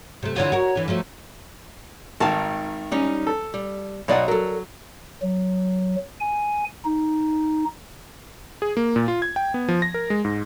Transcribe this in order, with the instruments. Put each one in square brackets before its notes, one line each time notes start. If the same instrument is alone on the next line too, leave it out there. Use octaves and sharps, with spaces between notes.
[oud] C3 A3
[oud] D3 E3 F4 [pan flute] C#5
[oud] F#4 A#4
D3 E3
F3 F#3 A3
[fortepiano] G#1 D#3 [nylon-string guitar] F5 A5
[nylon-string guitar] G3 C#4 D#4
[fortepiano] A4
[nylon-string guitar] G3
[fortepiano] B1 F#5 [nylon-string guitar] F#3 D5 D#5
[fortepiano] F#3 [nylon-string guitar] A4 A#4
[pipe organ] F#3
G#5
D#4
[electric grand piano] G#4
A#3
A#2
F4
G#6
G5
B3
F3
A#6
A#4
G#3
G#2